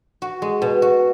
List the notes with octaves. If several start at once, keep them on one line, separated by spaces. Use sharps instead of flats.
F#4
G#3
B2
F#4